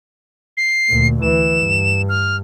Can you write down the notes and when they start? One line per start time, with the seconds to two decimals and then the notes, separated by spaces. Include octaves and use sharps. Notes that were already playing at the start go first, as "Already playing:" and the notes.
0.57 C7
0.89 D2 A#2
1.22 E3 E7
1.58 G2
2.09 F6